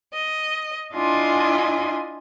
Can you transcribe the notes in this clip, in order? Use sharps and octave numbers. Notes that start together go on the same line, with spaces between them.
D#5
D4 E4 F4 D#5 G#5 C6